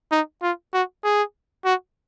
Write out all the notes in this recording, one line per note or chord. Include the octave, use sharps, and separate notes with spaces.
D#4
F4
F#4
G#4
F#4